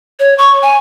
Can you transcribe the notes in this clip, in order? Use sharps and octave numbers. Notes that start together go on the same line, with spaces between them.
C#5
C#6
G#5